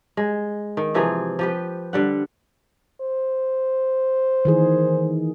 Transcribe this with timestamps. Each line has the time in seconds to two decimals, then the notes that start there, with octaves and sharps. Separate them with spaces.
0.17 G#3
0.77 D#3
0.94 C3 E3 F3 G#4
1.39 F3 G4 B4
1.93 D3 G3 F#5
3.01 C5
4.45 D#3 E3 G#4